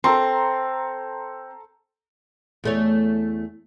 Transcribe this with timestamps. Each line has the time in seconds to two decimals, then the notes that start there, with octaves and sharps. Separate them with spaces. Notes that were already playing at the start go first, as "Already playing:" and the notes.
0.04 C4 A4 A#5 C6
2.64 E2 A3 C#5